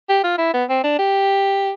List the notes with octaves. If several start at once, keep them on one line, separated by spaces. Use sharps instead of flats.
G4
F4
E4
B3
C4
D4
G4